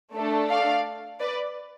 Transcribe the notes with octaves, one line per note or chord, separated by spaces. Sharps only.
A3 D4 A4
D5 F5
B4 D5